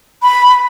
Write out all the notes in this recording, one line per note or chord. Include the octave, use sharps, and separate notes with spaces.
B5